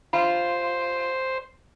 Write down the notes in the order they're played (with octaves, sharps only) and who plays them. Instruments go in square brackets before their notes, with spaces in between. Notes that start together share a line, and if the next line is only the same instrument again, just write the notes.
[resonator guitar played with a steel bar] F4 [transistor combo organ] C5 [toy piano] B5